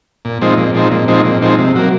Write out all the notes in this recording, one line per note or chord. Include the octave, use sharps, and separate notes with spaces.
A#2
F3 G#3 C4 D#4
A#2
F3 G#3 C4 D#4
A#2
F3 G#3 C4 D#4
A#2
F3 G#3 C4 D#4
C3
F#3 A#3